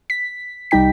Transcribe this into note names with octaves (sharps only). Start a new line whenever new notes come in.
B6
C2 G3 D#4 G5 B6